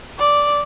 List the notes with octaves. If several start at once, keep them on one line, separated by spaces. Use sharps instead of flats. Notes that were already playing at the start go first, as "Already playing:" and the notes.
D5